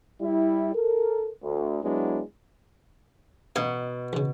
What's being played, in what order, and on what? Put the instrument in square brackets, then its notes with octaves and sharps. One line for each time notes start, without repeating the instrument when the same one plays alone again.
[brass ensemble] G3 E4
A4 A#4
D2
F#3 G#3 B3 D4 E4
[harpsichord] A1 F5 [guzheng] B2
[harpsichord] E2 C#3